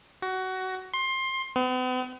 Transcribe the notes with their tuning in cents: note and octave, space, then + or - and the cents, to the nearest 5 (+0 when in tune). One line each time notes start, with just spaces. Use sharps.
F#4 +20
C6 +20
B3 +45